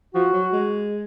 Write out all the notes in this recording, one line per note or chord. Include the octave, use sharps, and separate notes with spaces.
F3 F#4
F#3
G#3